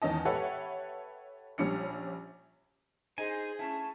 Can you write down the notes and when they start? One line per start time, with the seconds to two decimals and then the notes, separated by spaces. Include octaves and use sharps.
0.02 E2 D#3 C#4 D#5 A5
0.25 G4 A4 B4 C#5 E5 F#5
1.58 A#1 G3 C#4 D4 C#7
3.18 D#4 G#4 C5 G#5
3.59 A3 C#4 E4 A5